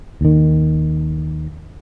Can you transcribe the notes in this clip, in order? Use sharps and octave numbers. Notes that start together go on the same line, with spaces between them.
D#2 D#3